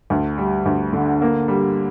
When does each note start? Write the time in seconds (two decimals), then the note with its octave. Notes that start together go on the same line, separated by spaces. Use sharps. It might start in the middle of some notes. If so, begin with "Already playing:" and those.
0.10 D2
0.38 G3
0.66 D2
0.93 D3
1.22 A#3
1.48 G3